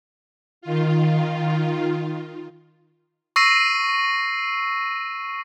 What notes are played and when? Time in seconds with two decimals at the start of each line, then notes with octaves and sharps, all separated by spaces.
0.61 D#3 F4
3.36 C#6 E6 A#6 C7 D#7